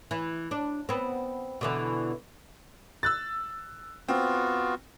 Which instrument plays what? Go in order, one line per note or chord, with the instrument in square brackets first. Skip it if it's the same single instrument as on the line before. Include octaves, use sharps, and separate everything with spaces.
[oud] E3
D4
B3 C4
B2 D3 E3
[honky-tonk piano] E6 F#6 A6
[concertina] B3 F4 F#4 [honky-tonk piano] C4